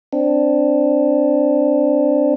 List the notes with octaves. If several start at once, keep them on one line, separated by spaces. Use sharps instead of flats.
C4 D4